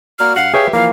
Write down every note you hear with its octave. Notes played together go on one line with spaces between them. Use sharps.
A#3 F#4 D5 F6
G2 F5 F#5
G4 G#4 B4 C#5 E5 G5
E3 F3 A#3 F5